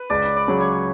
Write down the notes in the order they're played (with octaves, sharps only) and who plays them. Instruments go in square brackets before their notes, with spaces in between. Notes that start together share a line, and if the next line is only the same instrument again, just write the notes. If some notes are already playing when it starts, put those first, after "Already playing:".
Already playing: [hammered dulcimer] B4
[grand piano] C#2 [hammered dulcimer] D5
[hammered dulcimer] D5
[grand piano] C#3 F#3
[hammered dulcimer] C#5